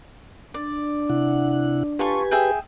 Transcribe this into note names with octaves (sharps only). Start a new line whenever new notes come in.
D4 D5
C3 E4 F#5
F4 G4 A4 B4 G#5 C#6
G#4 E5 G5